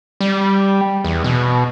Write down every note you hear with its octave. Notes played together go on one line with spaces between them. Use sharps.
G3
E2
B2